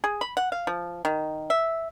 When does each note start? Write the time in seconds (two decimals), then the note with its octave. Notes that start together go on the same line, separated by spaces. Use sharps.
0.04 G#4
0.21 B5
0.37 F#5
0.52 F5
0.67 F3
1.05 D#3
1.50 E5